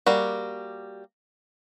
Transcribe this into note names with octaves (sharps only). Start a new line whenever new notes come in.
G3 A#3 F#4